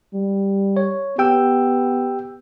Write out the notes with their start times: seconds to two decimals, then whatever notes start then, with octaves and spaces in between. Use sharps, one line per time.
0.14 G3
0.77 C#5
1.18 B3 G4 G5 E6